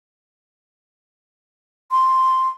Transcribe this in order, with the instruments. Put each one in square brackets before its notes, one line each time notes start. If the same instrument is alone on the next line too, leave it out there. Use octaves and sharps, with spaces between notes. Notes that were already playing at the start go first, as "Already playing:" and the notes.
[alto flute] C6